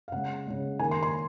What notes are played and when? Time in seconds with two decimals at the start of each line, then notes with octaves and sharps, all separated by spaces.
0.08 F5
0.12 C#3 G#3 F#5
0.47 C#3 G#3
0.79 D#3 A#3 G#5
0.91 C6
1.03 C6